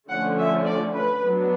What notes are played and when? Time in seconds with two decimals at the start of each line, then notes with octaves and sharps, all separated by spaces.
0.10 D3 F3 A3 C#4 F#5
0.39 E5
0.66 D5
0.95 B4
1.23 F#3 B3 D4